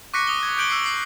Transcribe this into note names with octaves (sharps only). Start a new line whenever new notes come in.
C#6 D6 F#6 A#6 B6 C#7
D#6 G7
G#6
D6 G6 D7 F#7 G7
E6 C7
C7 F#7